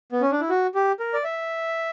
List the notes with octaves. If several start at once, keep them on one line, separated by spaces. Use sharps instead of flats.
B3
C#4
D4
E4
F#4
G4
A#4
D5
E5